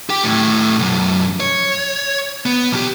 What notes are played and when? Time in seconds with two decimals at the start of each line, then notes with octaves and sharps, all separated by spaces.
0.10 G4 G5
0.24 D#2 A2
0.79 B1 F#2
1.40 C#5
2.46 B3
2.71 B1 G4